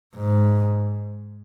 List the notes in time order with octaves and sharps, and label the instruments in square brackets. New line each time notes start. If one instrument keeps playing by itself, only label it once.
[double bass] G#2